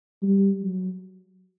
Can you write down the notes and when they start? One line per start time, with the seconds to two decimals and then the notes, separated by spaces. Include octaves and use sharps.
0.23 G3
0.62 F#3